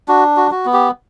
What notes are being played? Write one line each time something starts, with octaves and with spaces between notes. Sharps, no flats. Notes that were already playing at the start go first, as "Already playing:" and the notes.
D4 F#4
F#4
F#4
B3
G4